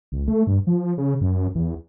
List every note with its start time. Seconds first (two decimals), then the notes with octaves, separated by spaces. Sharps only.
0.12 C#2
0.28 A3
0.47 G2
0.67 F3
0.98 C#3
1.21 F#2
1.55 E2